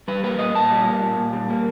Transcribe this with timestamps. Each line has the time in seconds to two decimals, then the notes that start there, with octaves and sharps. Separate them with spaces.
0.08 G3 B4
0.23 A#3 B4
0.39 A#2 D#5
0.55 A#2 A5
0.71 G3
0.86 A#3
1.02 A#2
1.18 A#2
1.33 G3
1.50 A#3